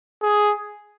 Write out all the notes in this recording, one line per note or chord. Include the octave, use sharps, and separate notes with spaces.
G#4